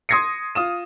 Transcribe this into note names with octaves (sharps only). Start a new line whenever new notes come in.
C6 D#6 G#6 A#6 C7 C#7
F4 D#6 E7